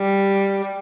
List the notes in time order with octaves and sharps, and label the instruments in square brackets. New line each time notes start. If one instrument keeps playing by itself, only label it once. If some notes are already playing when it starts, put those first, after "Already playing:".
Already playing: [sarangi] G3